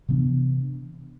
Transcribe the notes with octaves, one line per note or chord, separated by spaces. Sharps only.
C3 E3 B3 D4